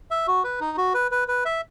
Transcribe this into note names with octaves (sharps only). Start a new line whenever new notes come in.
E5
F#4
B4
D#4
F#4
B4
B4
B4
E5